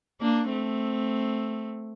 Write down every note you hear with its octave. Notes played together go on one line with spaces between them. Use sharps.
A#3 D4
A3 C4